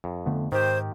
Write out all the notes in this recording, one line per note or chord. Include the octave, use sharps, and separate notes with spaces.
F2
D3 A3 B3
G#2 D#3 G4 C5